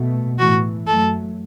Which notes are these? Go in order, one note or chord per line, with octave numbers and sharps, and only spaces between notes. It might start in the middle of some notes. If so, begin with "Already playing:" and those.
Already playing: B2 A3
A2 E3 A3 F#4
F#2 F#3 A3 A4